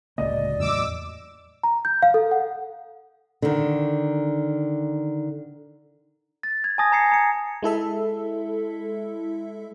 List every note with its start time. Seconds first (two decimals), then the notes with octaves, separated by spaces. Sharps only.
0.18 D1 C#2 A#3 D5 D#5
0.60 E2 A2 F#3 D6 E6
1.63 A#5
1.85 G6
2.02 F5
2.14 A4
2.31 F#5
3.42 D3 D#3
6.43 A6
6.64 G#6
6.78 G#5 A5 D#6 A#6
6.92 A#5 G#6 C7 C#7
7.11 A#5 C#7
7.63 G#3 E4 A4 E5